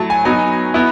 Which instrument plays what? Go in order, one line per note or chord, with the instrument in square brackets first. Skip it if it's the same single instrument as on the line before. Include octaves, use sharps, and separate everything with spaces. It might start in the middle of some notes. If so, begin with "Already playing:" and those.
Already playing: [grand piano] F#3 A3 E4 A5
G#5
F#3 B3 D#4 G#5
B3 E4